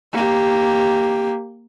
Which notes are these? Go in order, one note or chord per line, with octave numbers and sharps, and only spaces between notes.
A#3 G4